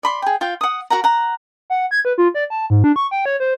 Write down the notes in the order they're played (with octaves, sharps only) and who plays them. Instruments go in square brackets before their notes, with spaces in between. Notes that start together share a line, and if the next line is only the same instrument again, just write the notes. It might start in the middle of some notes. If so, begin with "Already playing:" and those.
[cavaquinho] D5 B5 C6
G#4 G5
F4 F5 G5
F#5 D#6
F#4 A#4 F#5 A#5
F#5 A#5
[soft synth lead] F#5
G#6
B4
F4
D5
A5
G#2
D4
C#6
G5
C#5
C5